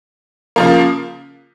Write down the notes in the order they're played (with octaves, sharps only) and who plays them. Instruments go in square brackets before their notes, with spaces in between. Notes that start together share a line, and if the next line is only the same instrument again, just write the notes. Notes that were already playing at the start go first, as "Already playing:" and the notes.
[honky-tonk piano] C#3 F3 A#3